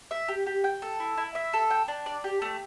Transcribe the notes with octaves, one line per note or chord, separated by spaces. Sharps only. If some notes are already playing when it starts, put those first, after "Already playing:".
E5
G4
G4
G5
A4
E4
E4
E5
A4
G5
D4
D5
G4
A3